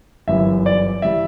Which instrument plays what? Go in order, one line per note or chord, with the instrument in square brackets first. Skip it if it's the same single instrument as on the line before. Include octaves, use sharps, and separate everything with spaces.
[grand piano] G1 F#2 E3 G3 E5
D5
E3 G3 E5